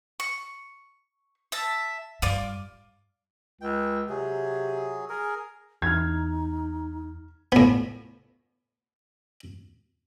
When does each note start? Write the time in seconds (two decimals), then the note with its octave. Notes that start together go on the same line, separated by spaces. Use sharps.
0.20 C#6
1.52 E5 A5
2.22 G2 F4 D5 D6
3.61 C#2 G5
4.10 C3 F#3 G#4
5.09 G#4 A#4
5.82 E2 D#4 F6 G#6
7.52 A2 B3